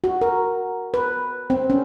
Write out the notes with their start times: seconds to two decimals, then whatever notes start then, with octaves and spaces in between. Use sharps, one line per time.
0.04 F#4
0.21 A#4
0.94 B4
1.50 C4
1.70 C#4